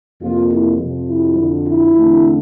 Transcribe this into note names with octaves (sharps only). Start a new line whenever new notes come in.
F2 C3 F3 A#3 F4
E4
F2 C3 F3
E4
F2 D3 F3
E4
E2 D3 A3 C4